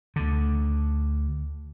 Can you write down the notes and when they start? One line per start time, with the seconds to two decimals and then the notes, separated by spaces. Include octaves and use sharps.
0.16 D2 D3